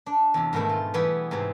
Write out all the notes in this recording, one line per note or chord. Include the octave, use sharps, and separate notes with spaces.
D4
E2 C3
G#2 B2 D#3 A3 E4
F4
E3 G3 B3 G#4 G5
G#2 C3 E3 C4